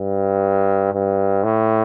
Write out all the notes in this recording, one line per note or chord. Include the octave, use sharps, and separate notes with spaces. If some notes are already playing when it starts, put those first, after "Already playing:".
Already playing: G2
G2
A2